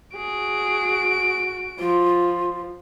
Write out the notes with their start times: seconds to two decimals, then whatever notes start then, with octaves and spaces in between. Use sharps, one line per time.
0.17 F#4 G#4 D7
1.79 F3 F4